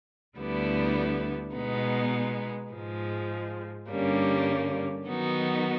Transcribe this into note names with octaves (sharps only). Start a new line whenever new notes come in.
D2 D3 G3 B3 E4
B2 G#3 B3 D#4
G#2 F3 G#3
G2 D3 G3 A#3 C#4
D#3 F#3 B3 D#4 F#4